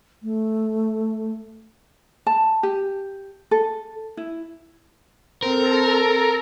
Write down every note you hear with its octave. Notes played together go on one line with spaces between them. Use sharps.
A3
A5
G4
A4
E4
C4 A4 A#4 A#5